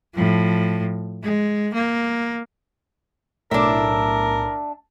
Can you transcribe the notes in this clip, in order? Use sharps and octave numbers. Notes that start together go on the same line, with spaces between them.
A2 F3
G#3
A#3
B1 A2 D4 A#4 E5